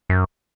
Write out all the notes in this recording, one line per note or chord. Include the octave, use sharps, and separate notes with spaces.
F#2